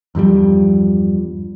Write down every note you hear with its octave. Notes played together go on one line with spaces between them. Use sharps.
E2 G2 F3 G3